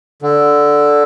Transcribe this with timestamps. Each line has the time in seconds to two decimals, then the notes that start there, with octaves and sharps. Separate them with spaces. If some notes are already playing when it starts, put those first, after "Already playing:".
0.22 D3